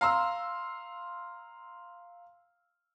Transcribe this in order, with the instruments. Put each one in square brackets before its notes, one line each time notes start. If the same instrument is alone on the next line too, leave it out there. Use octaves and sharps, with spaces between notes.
[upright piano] F5 A#5 C6 E6